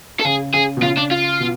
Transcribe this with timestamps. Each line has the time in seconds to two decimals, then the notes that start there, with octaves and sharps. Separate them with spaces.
0.20 A4
0.24 C#3 G#4
0.54 C#3 G#4
0.77 B2
0.82 C#3 F4
0.97 D4
1.11 F4
1.40 B2